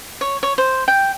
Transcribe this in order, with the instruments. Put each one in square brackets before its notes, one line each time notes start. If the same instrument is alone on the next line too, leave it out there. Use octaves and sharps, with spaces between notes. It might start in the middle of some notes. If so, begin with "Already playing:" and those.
[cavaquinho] C#5
C#5
C5
G5